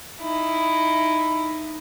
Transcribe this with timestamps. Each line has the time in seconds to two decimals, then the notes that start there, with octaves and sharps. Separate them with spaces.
0.21 D#4 E4